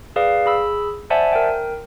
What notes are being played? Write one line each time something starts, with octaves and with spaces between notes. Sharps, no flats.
G#4 B4 D5 F5
G#4 B5 E6
C5 D5 E5 F#5 G#5 A5
A#4 G5